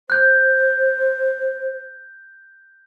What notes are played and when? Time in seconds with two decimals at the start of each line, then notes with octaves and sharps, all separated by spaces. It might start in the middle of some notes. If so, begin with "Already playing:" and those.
0.10 C5 F#6 G6